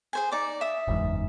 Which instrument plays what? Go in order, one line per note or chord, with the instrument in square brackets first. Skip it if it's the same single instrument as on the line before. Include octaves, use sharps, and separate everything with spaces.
[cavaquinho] G#4 C5 G#5
D#4 D5 D6
E5 D#6
[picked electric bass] F#1 E2 G#2